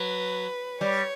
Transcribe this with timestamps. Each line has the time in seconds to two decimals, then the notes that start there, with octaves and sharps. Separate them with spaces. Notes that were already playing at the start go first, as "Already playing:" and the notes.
Already playing: F#3 B4
0.81 G3 C#5